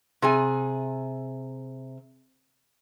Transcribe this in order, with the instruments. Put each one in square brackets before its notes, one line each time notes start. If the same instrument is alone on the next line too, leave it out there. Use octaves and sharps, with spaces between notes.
[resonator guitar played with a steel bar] C3 G#4 G#5